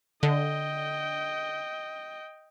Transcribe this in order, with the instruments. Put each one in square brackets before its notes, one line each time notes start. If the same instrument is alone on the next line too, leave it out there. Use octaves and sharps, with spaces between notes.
[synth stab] D3 [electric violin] D#5 G5